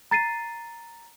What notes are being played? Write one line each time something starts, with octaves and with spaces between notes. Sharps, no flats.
A#5 A6 C7 D#7